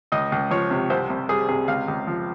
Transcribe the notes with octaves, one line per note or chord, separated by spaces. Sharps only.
C#2 D#5
C#2
F3 C#5
C3
C2 C5
C2
G3 G#4
C3 G#4
C#2 F5
C#2
F3